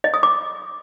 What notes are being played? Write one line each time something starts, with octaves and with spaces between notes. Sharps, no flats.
D#5
D#6
D6